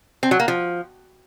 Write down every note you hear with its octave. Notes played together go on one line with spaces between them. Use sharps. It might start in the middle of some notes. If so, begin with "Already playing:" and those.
C4
F#3
A#3
F3